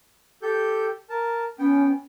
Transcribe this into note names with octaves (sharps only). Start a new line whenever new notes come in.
G4 A4 G6
A#4 A5
B3 C#4 G5